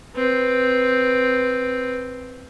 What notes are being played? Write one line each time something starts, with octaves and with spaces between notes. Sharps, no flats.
C4 B4